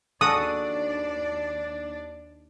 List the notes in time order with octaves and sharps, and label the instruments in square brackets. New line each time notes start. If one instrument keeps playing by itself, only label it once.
[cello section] D#2 D4 D5 [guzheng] F#4 A4 F#5 [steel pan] D#6